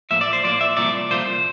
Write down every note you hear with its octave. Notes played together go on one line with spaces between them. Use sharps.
A2 F3 A#3 E5
D5
C5
A2 F3 A#3 D5
E5
C2 A#2 F3 A3 D5
C2 A#2 F3 A3 C5